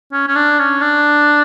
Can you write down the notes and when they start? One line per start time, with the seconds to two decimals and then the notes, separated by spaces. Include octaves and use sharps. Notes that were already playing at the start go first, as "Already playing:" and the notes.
0.13 C#4
0.28 C#4
0.35 D4
0.59 C#4
0.81 D4